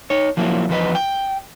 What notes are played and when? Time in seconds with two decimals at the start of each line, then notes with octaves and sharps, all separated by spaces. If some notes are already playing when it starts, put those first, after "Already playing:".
0.10 D#4 C#5
0.37 F3 F#3 A#3 E4
0.69 E2 F3 B4 D#5
0.95 G5